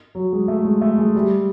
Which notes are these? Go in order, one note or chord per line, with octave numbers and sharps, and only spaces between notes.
F#3
G#3
A3
G#3
A3
G#3
G3